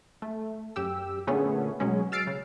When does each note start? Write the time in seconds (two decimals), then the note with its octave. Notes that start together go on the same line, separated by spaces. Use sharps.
0.22 A3
0.76 F#2 G4 E6
1.27 A#2 D3 A3 B3 C#4 G#4
1.80 B2 F#3 G#3 C#4
2.12 E6 F6 A6 C7 D7
2.27 C#3